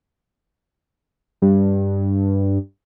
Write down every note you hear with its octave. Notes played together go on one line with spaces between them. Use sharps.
G2